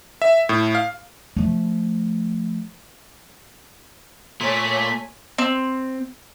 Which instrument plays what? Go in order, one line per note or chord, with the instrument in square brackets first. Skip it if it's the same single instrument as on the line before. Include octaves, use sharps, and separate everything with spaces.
[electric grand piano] E5
A2
F5
[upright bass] F3 A3
[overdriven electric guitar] A#2 [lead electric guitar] A3 [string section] C#5 G#5 [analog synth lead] B6
[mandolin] C4